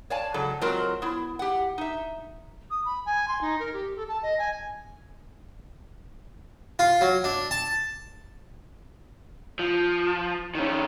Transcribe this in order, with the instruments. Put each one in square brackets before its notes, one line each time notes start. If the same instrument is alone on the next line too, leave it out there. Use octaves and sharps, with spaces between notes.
[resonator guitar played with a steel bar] C#5 D5 F5 G#5 A5
G#2 C#3 F#3 A4
F#3 G#3 C4 F4 A#4
B3 E4
G4 F#5
D#4 E5
[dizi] D#6
B5
G#5
C6
D#4
A#4
G4
A4
A5
D#5
G#5
[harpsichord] F4
F#3
D4
A5
[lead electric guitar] F3
D#3 C#4